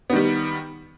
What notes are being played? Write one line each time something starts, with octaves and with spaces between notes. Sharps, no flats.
D#3 G3 B3